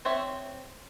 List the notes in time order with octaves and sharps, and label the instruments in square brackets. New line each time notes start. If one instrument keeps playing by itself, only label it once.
[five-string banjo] C4 C5 C#5 E5